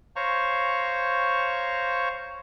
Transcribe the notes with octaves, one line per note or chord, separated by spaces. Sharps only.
C5 C#5 F5 A#5 C#6